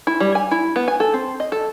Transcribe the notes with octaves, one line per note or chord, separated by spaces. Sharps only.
E4
G3
G#5
E4
B3
G#5
A4
C4
D#5
A4